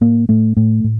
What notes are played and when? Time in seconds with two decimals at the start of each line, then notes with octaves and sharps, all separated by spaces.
0.01 A2 A#3
0.29 A2 A3
0.57 A2 A3
0.84 A2